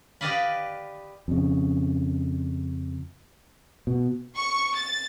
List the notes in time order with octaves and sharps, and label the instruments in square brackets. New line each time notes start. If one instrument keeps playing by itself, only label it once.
[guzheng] G4 B4 D5 D#5 F5 B5
[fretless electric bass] F2 C#3
B2
[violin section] C#6
A6